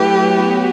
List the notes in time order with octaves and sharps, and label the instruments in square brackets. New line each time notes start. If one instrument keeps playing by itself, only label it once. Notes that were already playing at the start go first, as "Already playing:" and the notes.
Already playing: [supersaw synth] F#3 A3 E4 B4 [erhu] G4
[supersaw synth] F#3 B3 F#4 B4